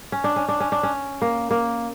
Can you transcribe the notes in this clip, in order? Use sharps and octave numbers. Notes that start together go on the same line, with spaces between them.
C#4
D4
C#4
D4
C#4
D4
C#4
A#3
A#3